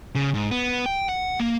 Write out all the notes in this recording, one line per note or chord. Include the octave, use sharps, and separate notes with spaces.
C#3
G#2
B3
G5
F#5
A#3